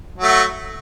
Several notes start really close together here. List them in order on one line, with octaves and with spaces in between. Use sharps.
F#3 A3 F#4